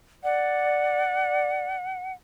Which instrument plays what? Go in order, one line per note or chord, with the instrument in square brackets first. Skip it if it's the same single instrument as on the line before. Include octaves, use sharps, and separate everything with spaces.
[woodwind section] D5 [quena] F#5